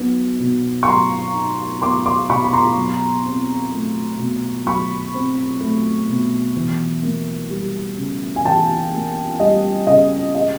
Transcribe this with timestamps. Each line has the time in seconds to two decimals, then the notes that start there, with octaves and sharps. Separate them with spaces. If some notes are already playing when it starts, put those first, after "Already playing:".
Already playing: F#3 B3 D#4
0.40 B2
0.83 C#6
0.88 F#3 A#5 C6
1.34 D#4
1.82 B3 C6 D6
2.06 C6 D6
2.29 B2 B5 C#6
2.44 B5
2.53 A#5 C6
2.77 F#3
3.25 C4
3.71 A3
4.19 B2
4.66 F#3 B5 C#6
5.14 C4
5.61 A3
6.09 B2
6.56 E3
7.03 A#3
7.50 G3
7.97 C#3
8.36 G#5
8.45 E3 G5 A5
8.92 A#3
9.40 G3 D#5
9.87 C#3 D#5
10.35 G#3 D#5